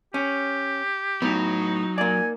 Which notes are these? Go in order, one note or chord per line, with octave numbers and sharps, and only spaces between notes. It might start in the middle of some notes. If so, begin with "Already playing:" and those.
C#4 G4
A2 F#3 B3 D#4
A#3 D5 G#5